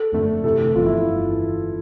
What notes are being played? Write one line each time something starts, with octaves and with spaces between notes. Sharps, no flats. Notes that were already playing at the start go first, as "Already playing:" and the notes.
Already playing: A4
G1 F2 D3 A3
C3 E3 A3 A4
G1 F2 E3 F4
E4